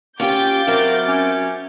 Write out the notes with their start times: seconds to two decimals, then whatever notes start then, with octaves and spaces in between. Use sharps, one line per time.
0.20 C#4 F4 G4 D6 G6 A6
0.67 F#3 C4 E4 A#4
1.08 C#4